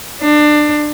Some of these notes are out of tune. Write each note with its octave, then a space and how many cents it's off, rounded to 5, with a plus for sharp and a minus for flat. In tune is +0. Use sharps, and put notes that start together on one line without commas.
D4 +25